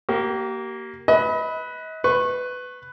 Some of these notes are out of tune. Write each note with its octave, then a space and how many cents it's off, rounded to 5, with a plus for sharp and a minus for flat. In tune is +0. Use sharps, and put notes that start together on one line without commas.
A#3 +0 G4 -35
B4 +0 D#5 +40
B4 +15 C#6 -25